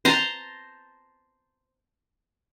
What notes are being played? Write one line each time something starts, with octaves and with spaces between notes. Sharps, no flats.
C5 A5 A#5